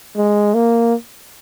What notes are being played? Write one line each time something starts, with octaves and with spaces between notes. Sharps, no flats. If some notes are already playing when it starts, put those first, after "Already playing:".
G#3
A#3